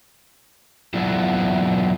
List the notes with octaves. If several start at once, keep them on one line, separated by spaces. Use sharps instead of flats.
F#3 B3 D4 E4 F4